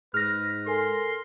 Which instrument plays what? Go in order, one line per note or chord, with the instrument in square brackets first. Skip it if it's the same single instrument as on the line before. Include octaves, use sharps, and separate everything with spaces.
[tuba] G#2 [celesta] G#4 [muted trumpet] B4 [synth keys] F6 A#6
[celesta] A4 A#4 G#5 [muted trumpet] C6